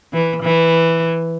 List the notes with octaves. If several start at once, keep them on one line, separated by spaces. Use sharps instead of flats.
E3
E3